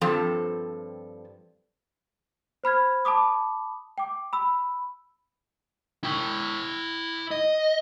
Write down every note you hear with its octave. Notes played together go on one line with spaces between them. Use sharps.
G2 F3 C4 A4
C5 B5 F6 G#6
A5 B5 D6 D#6
G5 D6
B5 E6
E4 G5
D#5